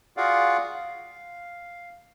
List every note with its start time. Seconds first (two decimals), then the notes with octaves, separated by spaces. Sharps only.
0.17 F4 F#4 G#4 D5 F5 F#5
0.75 F5